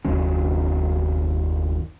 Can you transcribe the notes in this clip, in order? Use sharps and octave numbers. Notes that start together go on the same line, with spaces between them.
F#1 D#2 F#3 C#4